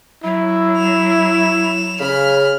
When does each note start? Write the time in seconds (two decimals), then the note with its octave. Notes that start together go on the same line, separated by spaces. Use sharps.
0.24 F#3 E4
0.77 E7 F7
2.00 C#3 B5 F6